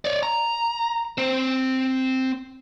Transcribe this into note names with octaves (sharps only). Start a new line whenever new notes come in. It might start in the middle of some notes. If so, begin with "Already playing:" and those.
C#5 D5
A#5
C4 C5